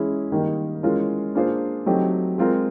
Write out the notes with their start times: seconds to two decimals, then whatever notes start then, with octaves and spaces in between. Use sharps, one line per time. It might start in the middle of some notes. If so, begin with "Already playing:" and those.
Already playing: E3 G#3 C#4 E4 G#4
0.32 D#3 G3 A#3 D#4
0.83 E3 G#3 C#4 F4 A#4
1.35 A#3 D4 F4 G#4 C5
1.86 F#3 A3 C4 D#4 G4
2.38 G#3 C4 F4 A#4